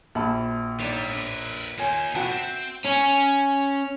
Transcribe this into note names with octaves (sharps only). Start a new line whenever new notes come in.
A#1 F#4 A5 B5
G3 D4 D#4 B4 C#5 D5
D4 A#4 B4
A#3 D#4 F4 C#5 G#5
B2 D3 F#4 B4 E5 G5 A5
C4 C5
C#4